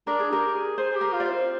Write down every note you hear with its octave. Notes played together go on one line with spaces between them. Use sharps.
D4 A#4
G#4
G4 A#4
G#4
G#4 C5
G#4
G4
A#4
F4
D5
C4 C5